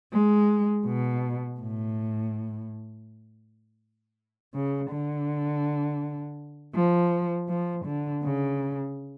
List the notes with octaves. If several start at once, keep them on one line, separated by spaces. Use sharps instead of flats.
G#3
B2
A2
C#3
D3
F3
F3
D3
C#3